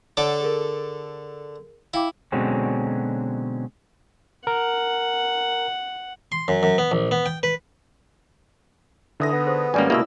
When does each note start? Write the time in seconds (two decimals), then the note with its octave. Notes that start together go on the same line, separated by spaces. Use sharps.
0.17 D3 A4 C#5 D5 F#5 D6
0.41 G#4 A#4
1.94 E4 F5 G5 D6
2.32 B2 D3 F#3 G#3 C4 C#4
4.47 A#4 F#5
6.32 C6
6.48 F#2
6.63 F#2
6.78 B3
6.92 A#1
7.11 B3
7.26 G5
7.43 B4
9.20 D3 E3 D#4 A4 D#6 A#6
9.33 B3
9.47 G#4 A4 C5
9.74 G#1 G3 A#3 C#4 G4 G#4 D5 G#5
9.90 C#2 B2 A#3 E4 E5 F#5 D#6 E6